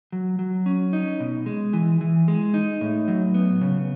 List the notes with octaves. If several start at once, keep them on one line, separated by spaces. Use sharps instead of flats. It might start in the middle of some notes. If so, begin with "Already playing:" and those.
F#3
F#3
C#4
D#4
B2
G#3
E3
E3
G#3
D#4
A2
F#3
B3
C#3